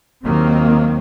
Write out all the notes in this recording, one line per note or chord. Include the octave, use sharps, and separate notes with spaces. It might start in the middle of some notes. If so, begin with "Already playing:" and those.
D#2 D#3 F#3 A#3 C4